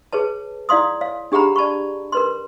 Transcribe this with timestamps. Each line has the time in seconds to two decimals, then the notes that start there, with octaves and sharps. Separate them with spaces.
0.13 G#4 B4 C#5 A5
0.69 E4 D5 F5 C6 D#6
1.01 C#5 F5
1.32 D4 G4 G#4 F#5 A#5 B5
1.56 D5 A5 B5 C#6
2.12 A#4 B4 C6